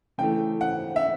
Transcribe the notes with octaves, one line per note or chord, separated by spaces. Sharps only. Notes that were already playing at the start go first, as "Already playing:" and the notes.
C#3 E3 A3 G5
F#5
E5